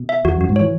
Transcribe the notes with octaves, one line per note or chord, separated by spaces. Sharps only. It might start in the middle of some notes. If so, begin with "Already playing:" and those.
Already playing: B2
E5
E2 F#4
F#2 F#4
G#2
E3 C#5